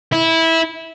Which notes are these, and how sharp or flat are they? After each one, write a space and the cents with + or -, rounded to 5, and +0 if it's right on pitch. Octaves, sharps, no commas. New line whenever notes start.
E4 -15